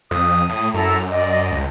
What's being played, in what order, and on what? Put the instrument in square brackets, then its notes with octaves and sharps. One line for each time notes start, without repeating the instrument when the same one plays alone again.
[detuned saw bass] F2 [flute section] D#6
[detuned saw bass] A2
[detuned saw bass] F#2 [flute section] E4 A4 A#5
[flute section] D5 D#5
[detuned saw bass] C#2